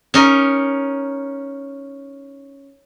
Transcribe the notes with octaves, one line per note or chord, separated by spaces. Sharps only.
C#4 D#4 A#4